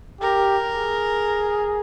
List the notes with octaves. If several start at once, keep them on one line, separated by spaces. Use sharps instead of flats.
G4 A#4
G#4